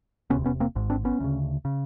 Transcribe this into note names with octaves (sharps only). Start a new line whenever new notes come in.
E1 D2 C3 B3 C#4
B3 C#4
A#3 C4
G#1 G#2
C4 D4
B3 C#4
D2 C#3
C#3